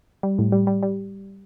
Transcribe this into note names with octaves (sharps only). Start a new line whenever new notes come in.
G3
A2
G3
G3
G3